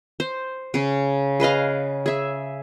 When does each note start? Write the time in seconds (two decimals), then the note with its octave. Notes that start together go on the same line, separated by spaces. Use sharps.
0.20 C5
0.74 C#3 C#4
1.40 G#4 B4 D#5 F5
2.06 G#4 E5